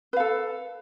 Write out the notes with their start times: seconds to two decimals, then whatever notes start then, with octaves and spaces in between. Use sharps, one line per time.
0.13 B4
0.16 F5
0.20 A4